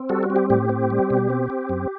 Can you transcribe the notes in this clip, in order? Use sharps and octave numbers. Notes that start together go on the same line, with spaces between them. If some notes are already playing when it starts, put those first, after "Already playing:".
Already playing: C4
G3 F#4 A4
F#4
C4
G4
A2 G4
C4
G3
B2
C4
C4
F#2